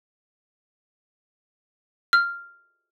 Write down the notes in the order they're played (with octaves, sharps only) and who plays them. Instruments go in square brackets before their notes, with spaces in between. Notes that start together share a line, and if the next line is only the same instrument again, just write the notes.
[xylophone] F6